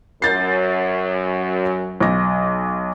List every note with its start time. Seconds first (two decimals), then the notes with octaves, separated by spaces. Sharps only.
0.22 F#2 G6 A6 C7
2.00 B1 A#6